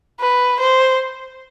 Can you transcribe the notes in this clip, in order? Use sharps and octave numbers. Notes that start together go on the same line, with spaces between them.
B4
C5